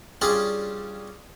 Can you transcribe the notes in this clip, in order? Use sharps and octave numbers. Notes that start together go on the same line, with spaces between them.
G3 C#4 D4 F4 G#4